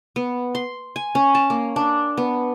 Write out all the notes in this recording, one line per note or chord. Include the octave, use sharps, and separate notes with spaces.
B3
C6
G#5
C#4
A5
A#3
D4
B3